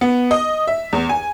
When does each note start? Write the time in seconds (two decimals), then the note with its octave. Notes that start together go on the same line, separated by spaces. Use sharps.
0.01 B3
0.31 D#5
0.67 E5
0.93 E2
1.09 G#5